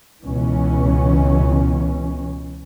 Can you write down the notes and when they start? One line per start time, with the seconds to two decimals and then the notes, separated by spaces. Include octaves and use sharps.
0.24 C#2 B2 E3 C#4